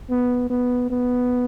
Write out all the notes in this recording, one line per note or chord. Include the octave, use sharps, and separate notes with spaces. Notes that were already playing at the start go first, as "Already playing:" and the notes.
B3
B3
B3